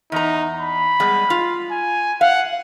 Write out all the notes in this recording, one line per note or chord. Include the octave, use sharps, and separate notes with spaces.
E2 D#4 A#5
B5
G3 G#3 B3
F4
G#5
F5 F#5